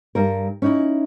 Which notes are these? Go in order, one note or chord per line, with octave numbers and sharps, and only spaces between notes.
G2 G3 A#4
C#4 D#4 E4